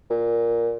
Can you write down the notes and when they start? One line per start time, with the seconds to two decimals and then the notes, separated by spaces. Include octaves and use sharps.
0.10 A#2